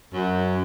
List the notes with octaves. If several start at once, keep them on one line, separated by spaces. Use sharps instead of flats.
F#2